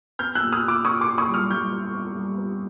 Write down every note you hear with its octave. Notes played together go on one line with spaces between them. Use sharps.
B3 F6 G6
E6 F#6
A#2
D#6 F6
A#2
D6 E6
A#2 C#6 D#6
C6 D6
A#2
C#6 D#6
G3
D#6 F6
G3 F6 G6
B3
B3
G3
B3